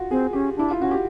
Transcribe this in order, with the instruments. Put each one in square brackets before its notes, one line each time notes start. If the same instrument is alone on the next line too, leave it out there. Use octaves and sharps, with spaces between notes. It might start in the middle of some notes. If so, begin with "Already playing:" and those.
Already playing: [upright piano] F4 F#4
[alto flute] C4 [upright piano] G#4
[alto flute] C#4 [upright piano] G4
[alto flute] D4 [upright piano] E4
[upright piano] F4
[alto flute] C#4 [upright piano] F#4
[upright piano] G4